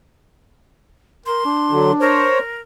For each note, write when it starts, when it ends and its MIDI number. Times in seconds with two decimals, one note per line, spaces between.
1.26 1.41 70
1.26 1.92 84
1.45 2.27 62
1.71 1.91 50
1.71 1.91 54
2.01 2.61 70
2.01 2.39 72
2.01 2.39 73